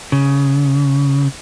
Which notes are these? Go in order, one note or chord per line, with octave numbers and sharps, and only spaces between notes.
C#3